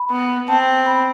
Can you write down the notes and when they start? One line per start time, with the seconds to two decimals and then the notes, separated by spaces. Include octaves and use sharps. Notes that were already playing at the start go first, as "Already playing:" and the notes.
Already playing: B5
0.11 B3
0.48 C4 A5
0.86 B5